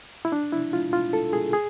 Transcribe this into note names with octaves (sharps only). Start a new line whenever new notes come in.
E4
D4
E4
F4
F4
A4
G#4
G#4